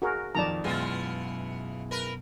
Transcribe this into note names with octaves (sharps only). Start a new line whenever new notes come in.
F#4 G#4 A#4
F2 A#2 D#3 D5 A5 A#5
F#2 B2 E3 G#3 B3 F4
A#4 B4